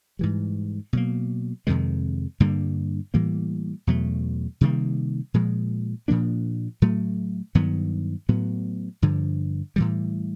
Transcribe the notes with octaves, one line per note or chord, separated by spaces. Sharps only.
G#2 E3 G3
B2 F#3 A#3
F2 C3 D#3 G#3
G2 D3 G3 A#3
A2 E3 G3 A#3
E2 B2 F#3 A3
C3 D#3 G3 A#3
A#2 F3 G#3
A#2 F3 A#3 D4
A2 F#3 A3
G2 D#3 F#3 B3
A2 F#3 B3
G2 D3 F3
A2 E3 G3